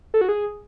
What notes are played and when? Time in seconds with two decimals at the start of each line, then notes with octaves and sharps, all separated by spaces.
0.14 A4
0.21 F#4
0.29 G#4